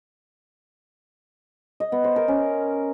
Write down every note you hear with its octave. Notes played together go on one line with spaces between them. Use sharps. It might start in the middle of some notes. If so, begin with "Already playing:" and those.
D#5
B3
C5
A#4
C#4